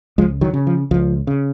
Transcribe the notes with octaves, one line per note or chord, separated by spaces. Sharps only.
C#2 F3 G#3
D#3 F#3
C#3
F3
C#2 F3
C#3